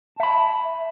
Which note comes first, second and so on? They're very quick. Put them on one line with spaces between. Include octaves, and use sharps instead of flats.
A5 E5 B5